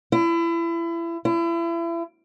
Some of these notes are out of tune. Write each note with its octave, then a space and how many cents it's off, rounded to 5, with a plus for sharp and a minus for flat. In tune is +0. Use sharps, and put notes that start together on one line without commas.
E4 +30
E4 +35